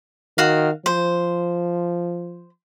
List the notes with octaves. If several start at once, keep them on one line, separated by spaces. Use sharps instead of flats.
D#3 F#4 F5
F3 C5